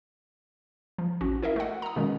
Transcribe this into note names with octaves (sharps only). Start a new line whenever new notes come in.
F3
A1 C#4 F#4
E4 A#4 D#5 E5
A3 F#5
A#5 D#6
B2 D#3 G#3 C#4